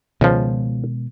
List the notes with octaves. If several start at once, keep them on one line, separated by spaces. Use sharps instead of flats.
C#2 B2 D#3 F3 G#3